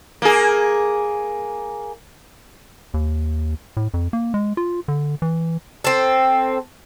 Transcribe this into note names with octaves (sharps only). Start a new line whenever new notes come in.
A#3 G#4
D#2
A2
F2
A#3
G#3
F4
D3
E3
C4 A4